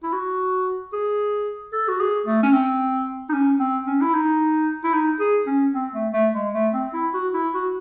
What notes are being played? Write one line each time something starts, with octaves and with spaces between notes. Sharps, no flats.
E4
F#4
G#4
A4
F#4
G#4
A3
C#4
C4
D#4
C#4
C4
C#4
E4
D#4
E4
D#4
G#4
C#4
C4
A3
A3
G#3
A3
C4
E4
F#4
E4
F#4